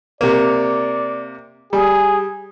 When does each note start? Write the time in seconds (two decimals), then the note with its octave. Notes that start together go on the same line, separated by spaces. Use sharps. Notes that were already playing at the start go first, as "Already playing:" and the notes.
0.21 C3 A#3 D5
1.73 G3 G#4